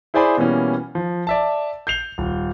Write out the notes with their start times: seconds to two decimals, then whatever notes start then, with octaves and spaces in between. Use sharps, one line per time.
0.14 E4 G#4 C5 D5 G#5 B5
0.37 B2 E3 G3 A#3 C#4
0.95 F3
1.27 D5 E5 A5
1.87 G6 C7 F7 G7
2.18 D#1